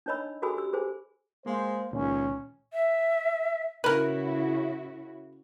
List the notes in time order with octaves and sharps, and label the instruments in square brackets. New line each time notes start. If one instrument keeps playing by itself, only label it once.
[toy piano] D4 D#4 C#5 D#5 B5 E6
F#4 G#4 A4 G#5 B5 E6
G4 E6
G4 G#4 C5 G#5
[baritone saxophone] G#3 [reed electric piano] A#3 F5 [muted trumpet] C5
[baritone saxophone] C#2 [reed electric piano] A#2 D#3 [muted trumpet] C#4
[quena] E5
[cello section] C#3 E4 F#4 [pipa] A#4 B4